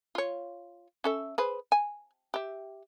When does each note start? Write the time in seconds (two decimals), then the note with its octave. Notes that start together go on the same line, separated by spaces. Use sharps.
0.15 F4 C#5
1.04 C#4 A4 E5
1.38 G#4 B4 C5
1.72 G#5
2.34 G4 E5